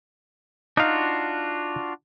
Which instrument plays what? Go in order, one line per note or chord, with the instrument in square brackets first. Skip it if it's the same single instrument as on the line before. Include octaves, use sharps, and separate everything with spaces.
[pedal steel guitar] D4 F4 F#4 [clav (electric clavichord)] D#4 F5